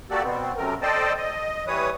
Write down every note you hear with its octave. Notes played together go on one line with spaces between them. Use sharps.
A#3 F#4 G4 A4 D5
B2 B3 C4
F#2 C3 A3 A#4
A4 C5 D5 D#5 G5 A5
D#5
E3 G3 B4 C#5 D#6